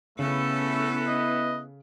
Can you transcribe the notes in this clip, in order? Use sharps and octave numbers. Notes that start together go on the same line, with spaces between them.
C#3 A3 B3 C#4 E4 A4 B4
D#5